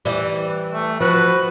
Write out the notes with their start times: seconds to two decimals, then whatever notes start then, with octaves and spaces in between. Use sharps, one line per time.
0.05 E3 G3
0.74 A3
1.00 F3 F#4 B4